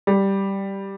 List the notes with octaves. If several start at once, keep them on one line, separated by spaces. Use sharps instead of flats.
G3